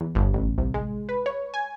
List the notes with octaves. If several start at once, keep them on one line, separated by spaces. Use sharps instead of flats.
E2
G1
A1
C2
G#3
B4
C#5
G#5